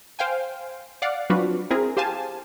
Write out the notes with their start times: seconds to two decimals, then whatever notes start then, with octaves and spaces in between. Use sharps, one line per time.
0.19 C5 F5 G5 G#5
1.02 D5 F5 F#5
1.30 F#3 C4 D4 F4 F#4 B4
1.70 C4 E4 G#4 A#4
1.97 G4 C5 F5 G#5 A5